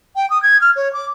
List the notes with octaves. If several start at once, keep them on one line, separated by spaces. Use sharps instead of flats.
G5
D#6
G#6
F6
C#5
D6